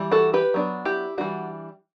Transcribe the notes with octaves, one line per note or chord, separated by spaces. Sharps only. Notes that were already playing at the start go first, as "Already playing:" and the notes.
Already playing: E3 G3
F#4 A4
G4 B4
F#3 B3 D4
E4 G4
E3 G3 B3 D4 F#4